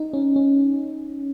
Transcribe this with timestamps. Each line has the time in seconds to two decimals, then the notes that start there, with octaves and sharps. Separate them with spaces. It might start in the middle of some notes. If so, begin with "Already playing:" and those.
Already playing: D#4
0.13 C#4
0.36 C#4